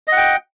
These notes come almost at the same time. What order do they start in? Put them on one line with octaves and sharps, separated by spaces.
D#5 F#5 G5